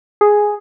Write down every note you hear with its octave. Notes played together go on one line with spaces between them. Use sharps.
G#4